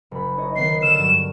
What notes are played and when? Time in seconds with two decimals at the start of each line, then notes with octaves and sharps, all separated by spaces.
0.11 F#1 B5
0.37 D#4 C#5 D#5
0.56 D#3 B3 C7
0.82 D3 E6 F6 E7
0.98 G2 F#3